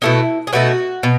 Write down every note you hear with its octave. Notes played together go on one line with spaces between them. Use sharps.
B2 A3 D#4 E4
G#4
B2 A3 D#4 F#4
B2